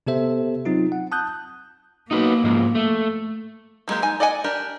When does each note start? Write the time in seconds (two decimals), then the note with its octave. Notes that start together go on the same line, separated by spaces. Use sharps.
0.07 C3 B3 G4 A4 C5 E5
0.65 F#3 C4 D#4 F4
0.92 F#5
1.12 A5 D#6 F#6 G6
2.11 A#3 D#4 F#4 B4
2.44 G#2 F3 G#3
2.75 A3
3.88 F3 F#3 G#3 A#3 G4
4.02 D#4 G#5
4.20 D5 D#5 F#5 G#5
4.44 D4 G4 A#4